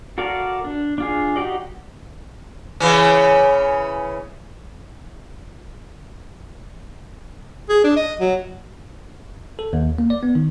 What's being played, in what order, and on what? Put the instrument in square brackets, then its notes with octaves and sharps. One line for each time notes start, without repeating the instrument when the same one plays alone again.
[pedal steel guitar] F#4 A4 A#4 D5 F5
D4
D4 F4 G#4
D#4 F#4 G4 D5 D#5
[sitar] C#3 E3 C#4
[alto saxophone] G#4
D4
D#5
F#3
[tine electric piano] A4
D#2
A#3
D5
B3
D#3